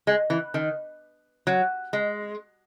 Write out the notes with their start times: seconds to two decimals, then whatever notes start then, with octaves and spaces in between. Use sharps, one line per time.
0.07 G#3
0.30 E3
0.54 D#3
1.47 F#3
1.93 G#3